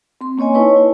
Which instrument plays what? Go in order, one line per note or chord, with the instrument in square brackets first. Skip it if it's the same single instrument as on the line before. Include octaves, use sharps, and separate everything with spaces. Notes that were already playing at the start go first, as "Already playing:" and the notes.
[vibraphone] C4 C6
A#3 C#4 C#5 D#5 G#5
D#4 E4 B4 C#5 A5 C#6
E4